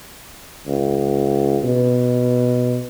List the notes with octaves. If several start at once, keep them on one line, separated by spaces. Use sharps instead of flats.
C#2
B2